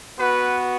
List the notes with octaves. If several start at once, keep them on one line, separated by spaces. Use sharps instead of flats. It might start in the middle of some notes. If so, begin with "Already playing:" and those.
B3 F#4 B4